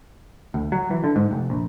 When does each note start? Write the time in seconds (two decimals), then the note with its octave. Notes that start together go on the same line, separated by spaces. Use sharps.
0.54 D2
0.72 F#3
0.91 E3
1.04 D3
1.16 G#2
1.31 F1
1.50 A#1